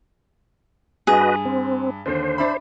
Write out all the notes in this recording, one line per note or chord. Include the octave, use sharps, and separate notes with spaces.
G2 F#4 G#4 B4 D#5
C4
D#2 D3 C5
D4 E5 B5